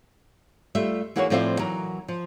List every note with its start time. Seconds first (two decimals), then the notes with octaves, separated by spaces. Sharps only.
0.75 G3 A3 F4 E5
1.16 E3 A#3 F#4 G#4 A#4 C#5
1.30 A2 F3 C4 F4 D5 E5
1.59 E3 F#3 A#4
2.08 F3